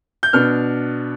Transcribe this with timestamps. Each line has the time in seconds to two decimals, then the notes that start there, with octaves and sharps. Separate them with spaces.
0.23 G6
0.33 B2 B3 D4 F6